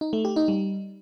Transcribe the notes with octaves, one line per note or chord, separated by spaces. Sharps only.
D#4
A3
G4
D#4
G3